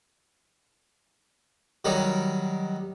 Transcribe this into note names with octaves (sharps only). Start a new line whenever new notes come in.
D#3 F#3 G3 D#4